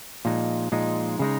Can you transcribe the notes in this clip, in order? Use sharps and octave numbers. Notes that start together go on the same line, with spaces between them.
A#2 F3 G#3 D#4
A#2 F3 G#3 D#4
C#3 G#3 D#4